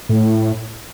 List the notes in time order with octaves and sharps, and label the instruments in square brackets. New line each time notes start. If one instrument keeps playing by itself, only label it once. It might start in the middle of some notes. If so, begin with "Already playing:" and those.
[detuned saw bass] A2